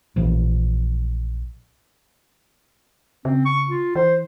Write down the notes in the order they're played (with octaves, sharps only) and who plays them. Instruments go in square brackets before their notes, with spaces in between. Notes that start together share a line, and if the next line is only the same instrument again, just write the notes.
[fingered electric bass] A#1 A#2 E3 F3
[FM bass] C#3 [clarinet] C4
[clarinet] C#6
F4
[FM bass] E3 [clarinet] C5